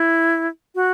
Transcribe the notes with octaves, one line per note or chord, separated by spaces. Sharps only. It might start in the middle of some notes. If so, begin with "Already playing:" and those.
Already playing: E4
F#4